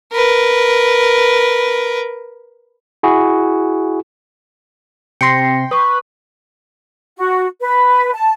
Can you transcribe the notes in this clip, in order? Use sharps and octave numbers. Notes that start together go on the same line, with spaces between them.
A#4 B4
E4 F#4 G#4
C3 G5 C6 A#6 C7 C#7
B4 C#6 D#6
F#4
B4
A5